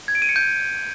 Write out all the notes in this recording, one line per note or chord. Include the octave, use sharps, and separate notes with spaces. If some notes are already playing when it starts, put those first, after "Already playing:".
G#6
D7
D#7
C#7
G6